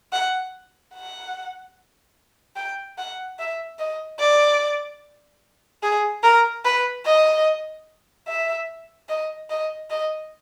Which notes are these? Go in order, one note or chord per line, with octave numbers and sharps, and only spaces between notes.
F#5
F#5
G5
F#5
E5
D#5
D5
G#4
A#4
B4
D#5
E5
D#5
D#5
D#5